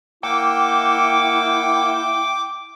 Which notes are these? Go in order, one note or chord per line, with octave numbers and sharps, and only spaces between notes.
A#3 E4 F#5 G5 D6 E6